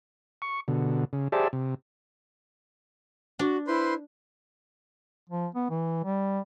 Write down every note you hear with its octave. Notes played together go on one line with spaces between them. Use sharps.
C#6
B2 D3
C#3
G4 G#4 C5 D5 E5 A5
C3
D4 F#4
E4 B4 C5 C6
F3
B3
E3
G3